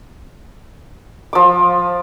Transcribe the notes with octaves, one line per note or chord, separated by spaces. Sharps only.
F3 D6